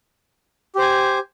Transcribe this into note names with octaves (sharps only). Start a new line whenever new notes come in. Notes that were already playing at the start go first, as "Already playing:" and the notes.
G4 C5 G#5